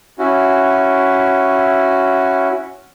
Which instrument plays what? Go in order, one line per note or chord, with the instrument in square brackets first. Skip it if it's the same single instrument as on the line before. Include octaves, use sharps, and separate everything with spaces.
[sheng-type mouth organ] C#4 E4 F#4